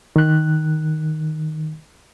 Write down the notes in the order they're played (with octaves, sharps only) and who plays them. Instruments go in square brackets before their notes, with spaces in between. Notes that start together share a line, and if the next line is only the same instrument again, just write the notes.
[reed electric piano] D#3 F#6